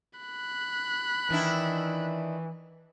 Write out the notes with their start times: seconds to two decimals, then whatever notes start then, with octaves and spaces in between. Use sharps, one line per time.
0.20 B5 F#6
1.30 D#3 E3 D4 E4